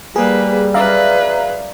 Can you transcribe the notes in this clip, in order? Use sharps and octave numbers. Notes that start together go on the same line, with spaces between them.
G3 A#3 G#4 B4
F#2 G#4 B4 D5 E5 F5 A#5